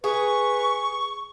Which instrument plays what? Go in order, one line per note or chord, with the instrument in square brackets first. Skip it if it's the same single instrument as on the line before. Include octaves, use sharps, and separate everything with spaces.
[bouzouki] G#4 [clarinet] B4 [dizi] C#6